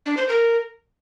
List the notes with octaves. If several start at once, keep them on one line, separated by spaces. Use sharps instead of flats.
D4
C5
A#4